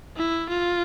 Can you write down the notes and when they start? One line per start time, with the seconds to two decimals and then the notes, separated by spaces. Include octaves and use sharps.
0.16 E4
0.50 F4